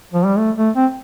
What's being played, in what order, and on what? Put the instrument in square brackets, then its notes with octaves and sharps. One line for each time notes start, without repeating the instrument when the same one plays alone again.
[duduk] F3
G3
A3
A3
C4